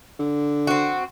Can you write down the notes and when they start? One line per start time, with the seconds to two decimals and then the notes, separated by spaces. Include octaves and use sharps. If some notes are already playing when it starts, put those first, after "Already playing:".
0.19 D3
0.67 C4 F#4